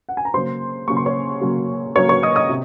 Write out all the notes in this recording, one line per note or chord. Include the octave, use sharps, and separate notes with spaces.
F#5
G#5
A#5
C#3 F#3 A#3 C5 C6
C#3 F#3 A#3 C#6
C6
C#5 C#6
C#3 F#3 A#3
C#3 F#3 A#3 C#5 C#6
C#5 C#6
D#5 D#6
D#5 D#6
C3